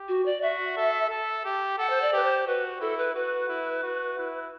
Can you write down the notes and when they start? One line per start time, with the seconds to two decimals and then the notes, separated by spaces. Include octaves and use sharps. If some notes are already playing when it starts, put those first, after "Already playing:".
Already playing: G4
0.08 F#4
0.25 D5
0.42 F#4 E5
0.77 A4
1.10 A4
1.45 G4
1.78 A4 F#5
1.90 C5
2.02 D5
2.13 G4 B4
2.24 C5
2.47 F#4 B4
2.81 E4 A4
2.98 B4
3.15 F#4 B4
3.49 E4
3.83 F#4
4.18 E4